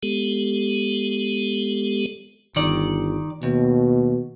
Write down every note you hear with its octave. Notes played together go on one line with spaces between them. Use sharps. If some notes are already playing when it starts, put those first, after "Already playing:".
G#3 B3 G4 A4
G1 D#3 D5
D#2 B2